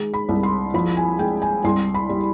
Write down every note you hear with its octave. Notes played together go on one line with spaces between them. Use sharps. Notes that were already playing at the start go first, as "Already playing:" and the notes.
Already playing: D#3 G#3
B5
C2
C6
F3 B5
G#5
G#3 G5
G#5
C2 C6
B5
G3